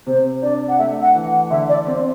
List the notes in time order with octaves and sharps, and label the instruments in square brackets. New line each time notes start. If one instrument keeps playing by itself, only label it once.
[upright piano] C3 [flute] C5
[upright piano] D4 [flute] D5
[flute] F#5
[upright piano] A3 [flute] E5
[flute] F#5
[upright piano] E3
[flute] F#5
[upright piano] D3 [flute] E5
[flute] D5
[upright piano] C4